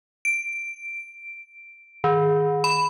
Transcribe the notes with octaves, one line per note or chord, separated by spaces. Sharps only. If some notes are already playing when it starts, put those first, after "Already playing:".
D7
D#3
B5